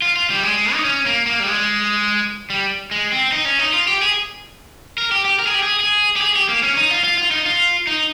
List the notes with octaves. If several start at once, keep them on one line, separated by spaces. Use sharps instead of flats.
F4
F4
G3
G#3
D#4
C#4
A#3
A#3
G3
G#3
G3
G#3
C4
D#4
C#4
D#4
F4
G4
G#4
A#4
G4
G4
A#4
G#4
G4
G#4
G#4
G4
G#4
G4
A#3
C#4
D#4
F4
F4
F4
D#4
F4
D#4